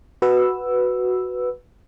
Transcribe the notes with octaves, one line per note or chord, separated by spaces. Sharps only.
F#4 B4 E6